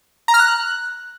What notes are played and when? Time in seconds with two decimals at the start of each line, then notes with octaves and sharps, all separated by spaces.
0.28 A#5
0.34 F6
0.39 F#6